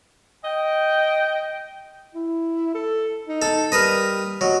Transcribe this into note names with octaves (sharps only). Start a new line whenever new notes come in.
D#5 G5
E4
A4
D#4
A4
G3 A#4 B4 D#5
F#3 D#5